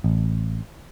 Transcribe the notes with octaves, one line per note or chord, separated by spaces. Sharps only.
A1